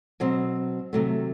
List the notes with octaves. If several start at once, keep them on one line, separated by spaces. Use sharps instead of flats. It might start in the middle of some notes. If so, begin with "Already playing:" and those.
B2 F#3 C4
C3 D#3 F#3 A3